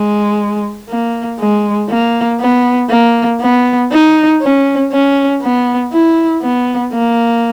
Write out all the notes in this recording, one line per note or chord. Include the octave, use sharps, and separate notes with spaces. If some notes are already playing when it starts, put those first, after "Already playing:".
Already playing: G#3
A#3
G#3
A#3
B3
A#3
B3
D#4
C#4
C#4
B3
E4
B3
A#3